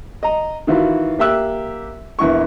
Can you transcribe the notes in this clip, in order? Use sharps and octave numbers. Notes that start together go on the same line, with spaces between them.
D#5 A#5
D#3 E3 F4 F#4 B4
A#3 G4 E5 E6 F#6
A#1 E2 E4 C#6